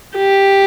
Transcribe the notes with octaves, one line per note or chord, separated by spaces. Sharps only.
G4